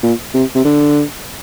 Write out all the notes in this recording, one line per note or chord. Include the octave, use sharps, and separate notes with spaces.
A#2
C3
C3
D3